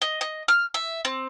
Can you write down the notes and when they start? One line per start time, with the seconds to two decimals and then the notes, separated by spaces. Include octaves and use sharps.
0.02 D#5
0.21 D#5
0.48 F6
0.74 E5
1.05 C4